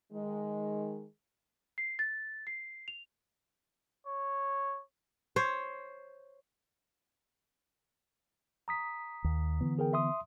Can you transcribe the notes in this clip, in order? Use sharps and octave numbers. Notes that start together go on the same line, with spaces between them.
D#3 G#3
C7
A6
C7
F7
C#5
C5 C#5
A#5 D#6 B6
D#2
D3 E3 B3
G#4 A#4 G5
E5 C6 D#6